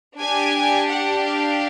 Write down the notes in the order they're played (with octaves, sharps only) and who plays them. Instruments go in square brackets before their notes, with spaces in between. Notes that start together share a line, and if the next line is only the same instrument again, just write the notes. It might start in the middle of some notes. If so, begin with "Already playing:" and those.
[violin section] D4 G4 G#5
F#5
F5